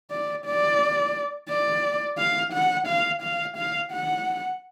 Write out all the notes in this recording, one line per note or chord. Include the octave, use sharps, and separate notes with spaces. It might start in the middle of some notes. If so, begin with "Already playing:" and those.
D5
D5
D5
F5
F#5
F5
F5
F5
F#5